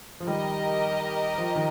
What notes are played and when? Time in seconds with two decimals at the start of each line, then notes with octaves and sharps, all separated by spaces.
0.20 F3
0.27 D#3 G3 G4 A#4 D#5
1.38 F3
1.55 D#3